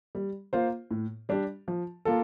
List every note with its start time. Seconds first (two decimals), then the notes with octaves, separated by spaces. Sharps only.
0.15 G3
0.53 A#3 F4 C5
0.91 A2
1.29 G3 D4 G4
1.68 F3
2.05 A#3 F4 A4